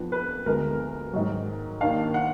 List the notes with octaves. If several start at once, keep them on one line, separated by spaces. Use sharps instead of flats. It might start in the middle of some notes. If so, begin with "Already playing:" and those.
Already playing: F2 F3 B3 D4
B4
D2 D3 G#3 B3 A#4
G#2 D#3 F#3
D#2 D#3 A#3 D4 F5
F#5